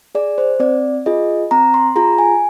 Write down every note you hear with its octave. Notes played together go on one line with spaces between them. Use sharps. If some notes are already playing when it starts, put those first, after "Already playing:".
G#4 D5
C5
C4 D5
F4 G#4 D#5
C4 A#5
C6
F4 G#4 A#5
G#5